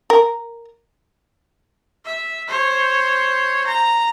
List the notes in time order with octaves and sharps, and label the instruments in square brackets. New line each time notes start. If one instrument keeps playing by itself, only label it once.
[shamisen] A#4
[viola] E5
C5 C#5
A#5